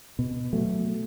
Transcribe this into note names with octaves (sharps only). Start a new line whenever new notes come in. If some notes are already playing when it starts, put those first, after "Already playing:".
B2
F#3 A3